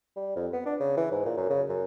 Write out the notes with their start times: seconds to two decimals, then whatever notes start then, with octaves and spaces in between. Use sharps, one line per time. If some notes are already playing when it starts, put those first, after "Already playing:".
0.16 G3
0.36 F2
0.53 B3
0.66 D4
0.80 C#3
0.97 E3
1.12 G#2
1.25 A#2
1.37 F#2
1.50 C#3
1.69 F#2